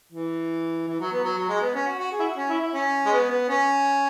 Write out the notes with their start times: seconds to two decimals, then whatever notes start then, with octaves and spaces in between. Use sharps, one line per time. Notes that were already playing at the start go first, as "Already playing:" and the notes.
0.12 E3
0.87 E3
1.00 F#3
1.12 B3
1.24 F#3
1.37 F#3
1.49 G#3
1.61 B3
1.75 C#4
1.87 F#4
1.99 F#4
2.12 G#4
2.19 E4
2.24 F#4
2.36 C#4
2.49 E4
2.61 E4
2.73 C#4
3.06 G#3
3.12 B3
3.30 B3
3.49 C#4